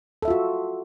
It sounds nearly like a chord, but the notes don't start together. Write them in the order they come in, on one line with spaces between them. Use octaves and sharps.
A4 E5 F4 F#4